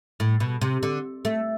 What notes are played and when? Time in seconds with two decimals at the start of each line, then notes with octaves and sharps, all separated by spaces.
0.20 A2
0.40 B2
0.61 C3
0.83 D3
1.25 A3